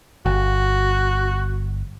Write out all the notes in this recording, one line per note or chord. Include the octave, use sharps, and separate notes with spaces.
G1 F#4